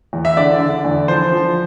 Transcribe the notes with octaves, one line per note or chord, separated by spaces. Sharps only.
E2
E5
D3 D5
D3
E2
F3 C5
F3